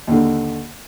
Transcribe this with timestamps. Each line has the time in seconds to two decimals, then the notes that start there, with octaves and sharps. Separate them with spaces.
0.08 D#2 D3